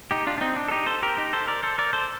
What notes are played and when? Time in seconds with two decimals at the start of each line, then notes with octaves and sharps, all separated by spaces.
0.11 D#4 G4
0.27 D4 F4
0.38 D4
0.41 C4 D#4
0.56 D4
0.68 A4
0.71 D#4 G4
0.86 A4 C5
1.03 G4 A#4
1.17 D#4 G4
1.33 A4 C5
1.47 A#4 D5
1.63 A4 C5
1.78 A#4 D5
1.93 A4 C5